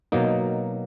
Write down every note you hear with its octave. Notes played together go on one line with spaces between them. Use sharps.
B2 F#3 A#3 D#4